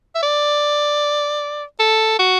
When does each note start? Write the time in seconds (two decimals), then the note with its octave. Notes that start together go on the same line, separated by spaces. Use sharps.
0.15 E5
0.23 D5
1.80 A4
2.19 F#4